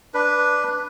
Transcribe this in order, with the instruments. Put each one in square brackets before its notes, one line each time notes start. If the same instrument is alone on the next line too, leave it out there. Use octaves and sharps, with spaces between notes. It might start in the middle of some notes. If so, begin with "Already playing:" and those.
[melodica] D4 B4